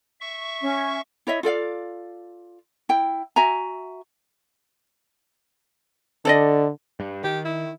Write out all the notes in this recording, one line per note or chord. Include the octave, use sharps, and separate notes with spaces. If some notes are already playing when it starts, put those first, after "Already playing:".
E5 C#6
C#4
E4 C#5 D#5 E5
F4 A4 D5 F5
E4 G5
F#4 E5 G#5 A#5
D3 A4 D5 D#5
G2
D#3 G4
E4